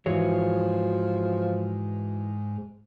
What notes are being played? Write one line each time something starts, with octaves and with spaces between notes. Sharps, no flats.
G#2 E3 F3 F#4 G#4 C#5